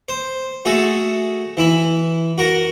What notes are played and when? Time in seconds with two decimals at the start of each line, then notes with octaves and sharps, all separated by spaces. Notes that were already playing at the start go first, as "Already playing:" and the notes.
0.09 C5
0.65 A3 F#4 G#4 A4
1.57 E3 E4 B5
2.38 F#4 A#4 F#5